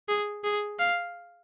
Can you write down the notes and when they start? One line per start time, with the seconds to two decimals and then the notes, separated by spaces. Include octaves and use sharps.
0.09 G#4
0.44 G#4
0.79 F5